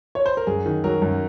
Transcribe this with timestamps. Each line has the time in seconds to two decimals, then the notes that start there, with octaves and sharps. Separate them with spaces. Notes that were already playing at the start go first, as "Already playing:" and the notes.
0.15 C#5
0.26 C5
0.37 A#4
0.47 F#2 G#4
0.66 D#3
0.84 F#3 A#4
1.02 F#2